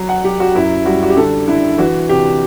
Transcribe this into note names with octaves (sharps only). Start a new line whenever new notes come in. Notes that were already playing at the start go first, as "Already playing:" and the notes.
Already playing: F#3
F#5
F#3 G4
F#4
F#2 E4
G3 F#4
F#4
G4
D3 A4
D3 E4
E3 F#4
C3 G4